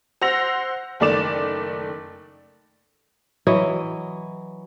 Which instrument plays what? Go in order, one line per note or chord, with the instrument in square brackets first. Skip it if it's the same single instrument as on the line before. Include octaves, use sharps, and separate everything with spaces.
[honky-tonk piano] C5 F#5 E6 A#6 F7
F#1 D#3 A3 D5 D6 E7
[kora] E3 F#3 E4 D#5